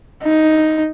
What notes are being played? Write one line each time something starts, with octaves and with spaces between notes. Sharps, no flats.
D#4